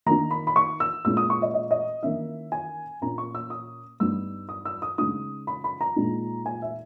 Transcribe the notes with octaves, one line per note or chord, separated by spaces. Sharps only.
D#3 A#3 D#4 A#5
B5
B5
C#6
E6
A#2 G#3 C#4 E4 E6
D#6
C#6
D#5
D#5
D#5
D#3 A#3 C#4 E4 E5
G#5
A#2 A#3 C#4 A#5
C#6
E6
D#6
G2 G3 B3 D#4 E6
D#6
E6
D#6
C#3 G#3 D#4 D#6
B5
B5
A#5
A#2 G#3 D#4
G#5
E5